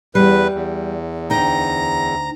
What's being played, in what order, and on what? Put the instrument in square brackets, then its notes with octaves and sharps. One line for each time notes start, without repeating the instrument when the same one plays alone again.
[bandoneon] E2 B4 [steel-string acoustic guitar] G3
[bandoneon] E2
[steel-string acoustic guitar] D2 D#4 G5 [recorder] A#5